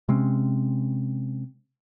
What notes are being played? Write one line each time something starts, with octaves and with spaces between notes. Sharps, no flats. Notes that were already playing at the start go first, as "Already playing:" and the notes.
C3 G#3 C4 C#4